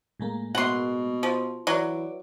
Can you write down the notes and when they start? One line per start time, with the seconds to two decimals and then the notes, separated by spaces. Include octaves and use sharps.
0.20 A2 G#3 A#3
0.55 B2 F#5 C6
1.23 F3
1.67 E3 F#3 D5